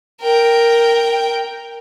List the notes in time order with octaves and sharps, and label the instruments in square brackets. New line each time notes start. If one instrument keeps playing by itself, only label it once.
[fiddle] A#4 G5